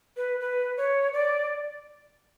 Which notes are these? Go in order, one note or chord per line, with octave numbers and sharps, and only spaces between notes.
B4
B4
C#5
D5